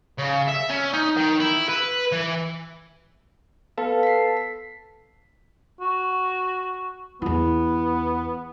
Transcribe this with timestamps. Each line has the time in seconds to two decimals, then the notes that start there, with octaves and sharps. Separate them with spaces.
0.18 C#3
0.49 E5
0.70 C#4
0.94 D#4
1.17 D#3
1.40 E4
1.69 B4
2.12 E3
3.78 B3 A4 B4 F5
4.03 B6 C7
4.37 B6
5.81 F#4
7.22 E2 B3 E4